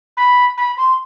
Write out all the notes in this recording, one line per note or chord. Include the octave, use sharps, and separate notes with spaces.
B5
B5
C6